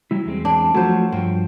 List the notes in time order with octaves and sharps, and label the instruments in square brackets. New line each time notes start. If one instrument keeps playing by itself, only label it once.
[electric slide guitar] F#3 G3 E4
E2 G#3 C4
[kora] D4
[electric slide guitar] F3 A3 [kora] F#3 C5
[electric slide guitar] G2 F3 [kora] C4